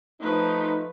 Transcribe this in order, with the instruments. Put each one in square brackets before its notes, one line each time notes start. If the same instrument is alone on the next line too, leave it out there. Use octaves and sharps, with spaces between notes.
[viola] F3 B4 [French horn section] A3 D#4